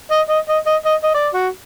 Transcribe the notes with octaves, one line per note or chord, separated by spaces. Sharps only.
D#5
D#5
D#5
D#5
D#5
D#5
D5
F#4